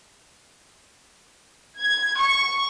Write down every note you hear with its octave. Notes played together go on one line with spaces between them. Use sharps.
G#6
C#6